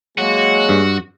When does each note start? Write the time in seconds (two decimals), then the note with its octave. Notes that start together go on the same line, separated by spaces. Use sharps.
0.18 F#3 G#3 A#3 F#4 G#4
0.69 G2